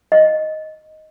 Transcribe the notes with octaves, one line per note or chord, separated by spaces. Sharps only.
D#5